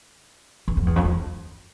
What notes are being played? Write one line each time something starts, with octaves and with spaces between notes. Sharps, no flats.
E2
F2
E2
F2
E2